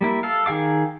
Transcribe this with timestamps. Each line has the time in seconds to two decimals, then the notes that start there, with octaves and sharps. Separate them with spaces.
0.01 G3 A#3 E4
0.23 A4 F5
0.46 D#3 G#4 F5 D6